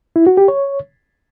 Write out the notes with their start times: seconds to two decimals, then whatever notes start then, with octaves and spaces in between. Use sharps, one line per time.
0.16 E4
0.27 F#4
0.37 G4
0.48 C#5